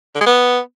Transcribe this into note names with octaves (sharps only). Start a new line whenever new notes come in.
D3
G#3
B3